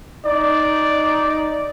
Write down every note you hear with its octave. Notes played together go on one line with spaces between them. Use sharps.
D#4 D5